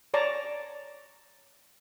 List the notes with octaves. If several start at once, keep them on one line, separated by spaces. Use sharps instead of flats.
C#5 D5 A5 A#5